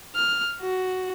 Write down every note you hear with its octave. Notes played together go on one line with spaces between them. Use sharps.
F6
F#4